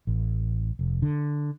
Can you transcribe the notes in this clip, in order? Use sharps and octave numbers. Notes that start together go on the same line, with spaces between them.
A1
F1
D3